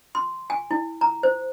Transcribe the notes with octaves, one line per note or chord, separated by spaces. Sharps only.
C6
G#5
E4
A#5
C5